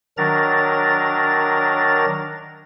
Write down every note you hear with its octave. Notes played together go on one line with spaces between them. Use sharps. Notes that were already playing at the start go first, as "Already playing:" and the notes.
D#3 F#3 D4 A#4 A#5 A6